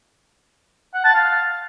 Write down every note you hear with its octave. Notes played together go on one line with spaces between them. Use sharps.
F#5
A5
F5